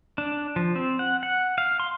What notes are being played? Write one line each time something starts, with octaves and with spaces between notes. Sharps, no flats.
D4
F3
C4
F#5
F#5
F5
C6